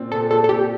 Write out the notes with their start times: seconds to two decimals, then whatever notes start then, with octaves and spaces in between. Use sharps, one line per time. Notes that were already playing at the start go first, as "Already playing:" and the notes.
Already playing: A#2 C4
0.12 A#2 A4
0.30 A#2 A4
0.44 A4
0.49 A#2 G4